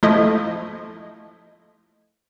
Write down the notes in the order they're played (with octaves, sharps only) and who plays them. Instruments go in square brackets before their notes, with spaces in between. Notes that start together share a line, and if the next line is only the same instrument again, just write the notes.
[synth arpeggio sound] F3 A3 E4 D#5